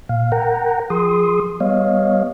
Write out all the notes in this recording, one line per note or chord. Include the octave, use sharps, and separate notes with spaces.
A#2 F5
A#4 F#5 G5 A#5
F3 G#4 C6 D#6
G3 B3 C#5 D#5 F5